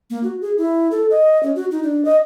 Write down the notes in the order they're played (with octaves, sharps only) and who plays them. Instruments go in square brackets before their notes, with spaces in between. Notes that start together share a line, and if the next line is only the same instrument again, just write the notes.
[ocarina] A#3
F#4
G#4
E4
A4
D#5
C#4
F#4
D#4
D4
D#5